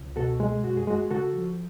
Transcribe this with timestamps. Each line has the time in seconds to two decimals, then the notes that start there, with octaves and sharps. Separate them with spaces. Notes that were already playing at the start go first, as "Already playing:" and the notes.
Already playing: C#2
0.16 B2 F#4 A4
0.40 G#3
0.63 F#2 F#4
0.77 G#4
0.87 G#3 F#4
1.10 C#3 F#4 A4
1.34 F3